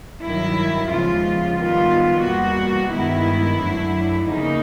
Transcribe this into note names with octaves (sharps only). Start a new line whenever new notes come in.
G2 D#3 F#3 E4
D#2 C#3 F3 G#3 B3 F4
G#2 D#3 G3 B3 F4
E2 B2 G3 A#3 F#4
G2 D#3 G#3 B3 E4
F#2 D3 F#3 A3
E2 C#3 F3 A#3 D#4